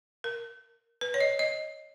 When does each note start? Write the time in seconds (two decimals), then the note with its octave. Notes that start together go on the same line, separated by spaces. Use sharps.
0.24 A#4
1.01 B4
1.14 C#5
1.20 D#5
1.39 D#5